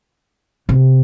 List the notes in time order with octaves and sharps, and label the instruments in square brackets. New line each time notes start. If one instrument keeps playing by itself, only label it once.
[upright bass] C3